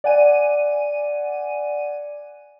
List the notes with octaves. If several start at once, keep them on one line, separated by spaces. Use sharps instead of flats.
D5 F#5 G#5 D#7